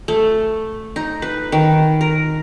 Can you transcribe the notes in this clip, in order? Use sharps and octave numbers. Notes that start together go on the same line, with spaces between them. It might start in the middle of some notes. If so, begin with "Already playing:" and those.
A3
D#4
B4
D#3
A#4